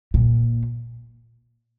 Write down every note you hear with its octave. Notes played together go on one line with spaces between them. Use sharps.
A#2